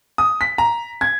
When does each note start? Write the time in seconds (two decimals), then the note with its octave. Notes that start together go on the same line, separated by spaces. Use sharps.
0.18 D#6
0.41 B6
0.58 A#5
1.01 G#6